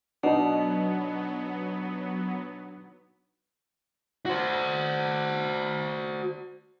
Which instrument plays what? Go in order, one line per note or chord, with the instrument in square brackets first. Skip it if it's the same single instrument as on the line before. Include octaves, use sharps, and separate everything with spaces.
[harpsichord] B2 [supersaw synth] F#3 B3 [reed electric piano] D4 D#4
[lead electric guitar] F#4 C5